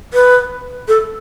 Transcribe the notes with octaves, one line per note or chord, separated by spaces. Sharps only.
B4
A4